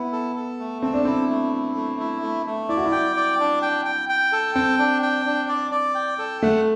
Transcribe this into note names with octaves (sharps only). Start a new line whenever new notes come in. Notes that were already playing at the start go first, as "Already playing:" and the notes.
Already playing: B3 E4
A4
A4
A3
C4 A4
D4
C4 E4
A3
E4
A3
E4
A3
A3
E4 D5
F#4
E4
G5
D5
D4
G5
G5
G5
A4
C4 G5
D4
G5
D4
D5
D5
G5
A4
A3 F#5